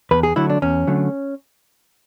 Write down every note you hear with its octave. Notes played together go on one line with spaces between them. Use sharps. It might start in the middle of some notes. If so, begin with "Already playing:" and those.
E2 B4
G#4
D3 F#3 A3 E4
D4
E2 C#4
D3 F#3 A3